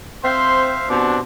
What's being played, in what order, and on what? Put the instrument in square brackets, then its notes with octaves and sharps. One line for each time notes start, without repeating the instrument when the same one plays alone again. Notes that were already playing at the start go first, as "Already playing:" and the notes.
[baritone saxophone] C4 [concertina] C5 E5 F5 [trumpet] C6
[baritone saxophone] B2 [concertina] C4 G4 [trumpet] D4